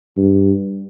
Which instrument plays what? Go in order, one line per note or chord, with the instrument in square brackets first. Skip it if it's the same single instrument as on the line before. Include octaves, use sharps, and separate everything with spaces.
[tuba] G2